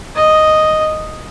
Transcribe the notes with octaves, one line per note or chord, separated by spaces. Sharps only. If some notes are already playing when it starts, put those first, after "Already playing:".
D#5